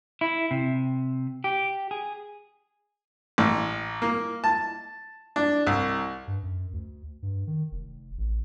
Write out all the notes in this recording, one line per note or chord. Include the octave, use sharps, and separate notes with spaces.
E4
C3
G4
G#4
A1
A#3
A5
D4
C2
G2
F#2
D2
G2
D#3
F1
A1